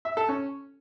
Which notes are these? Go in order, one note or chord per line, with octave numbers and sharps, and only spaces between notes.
E5
A4
C#4